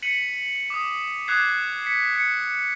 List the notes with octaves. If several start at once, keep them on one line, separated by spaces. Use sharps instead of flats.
B6 C#7 D#7 F#7
D6 D#6
D6 D#6 F#6 G#6 C7
B6 C#7
C#7